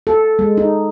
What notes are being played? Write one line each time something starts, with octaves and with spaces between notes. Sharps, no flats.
A4
G#3
D#4